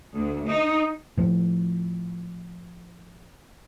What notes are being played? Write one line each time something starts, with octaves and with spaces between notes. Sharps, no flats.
D2
D#4
A2 F3